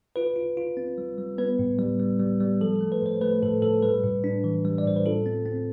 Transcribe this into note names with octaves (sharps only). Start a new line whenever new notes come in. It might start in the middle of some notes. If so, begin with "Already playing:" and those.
F4 B4
F4
F4
C4
G3
G3
B3 B4
A2
G3
G3
G3
G3
F3 A4
A4
A3
B4
A2 C5
A3 B4
A2 A4
A2 A4
G3 B4
A2
D4
E3
G3
D5
A2 C5
B4
F4 A4
C4
C4